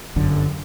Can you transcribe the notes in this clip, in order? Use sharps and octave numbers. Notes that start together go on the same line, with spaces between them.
G1 F#2 D3